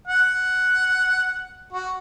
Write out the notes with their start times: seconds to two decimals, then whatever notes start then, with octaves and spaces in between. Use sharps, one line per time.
0.07 F#5
1.73 F#4